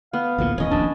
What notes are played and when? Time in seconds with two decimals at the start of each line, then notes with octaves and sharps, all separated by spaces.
0.13 B3 F5
0.38 A1 D2 A#2
0.58 D#1 E2 C#4 D#5
0.71 D1 A#1 D#2 D4